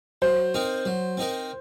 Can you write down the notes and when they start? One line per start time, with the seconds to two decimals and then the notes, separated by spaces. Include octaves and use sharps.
0.22 F#3 C5
0.54 C4 D#4 A#4
0.85 F#3
1.17 C4 D#4 A#4